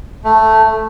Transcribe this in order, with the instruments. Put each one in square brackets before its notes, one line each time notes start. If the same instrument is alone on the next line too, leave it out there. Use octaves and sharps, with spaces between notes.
[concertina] A3